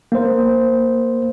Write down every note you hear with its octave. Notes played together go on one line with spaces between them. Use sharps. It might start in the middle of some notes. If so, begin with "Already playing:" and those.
A#3 C5